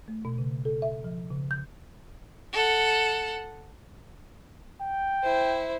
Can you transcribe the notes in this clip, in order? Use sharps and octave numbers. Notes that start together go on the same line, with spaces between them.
A3
B2
C#3
A4
E5
F3
C#3
G6
A4 F#5
G5
E4 C5